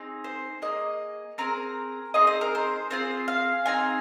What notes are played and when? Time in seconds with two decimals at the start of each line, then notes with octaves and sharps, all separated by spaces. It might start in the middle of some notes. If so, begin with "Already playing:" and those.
Already playing: C4 D#4 G#4
0.24 C5
0.62 A#3 G#4 D#5
1.38 C4 G#4 A#4
2.14 C4 D#4 G#4 D#5
2.27 C5
2.41 A#4
2.55 C5
2.90 C4 F4 G#4 C5
3.28 F5
3.65 C4 D#4 G#4 G#5